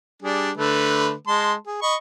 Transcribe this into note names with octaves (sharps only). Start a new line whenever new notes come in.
G3 D4 G#4
D3 A3 B4
G#3 A5 C6
G#4
D#5 B5 C#6